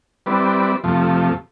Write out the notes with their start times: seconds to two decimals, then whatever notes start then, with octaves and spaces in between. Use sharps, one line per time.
0.26 G3 C4 E4 B4 D5
0.84 F2 C3 F3 A3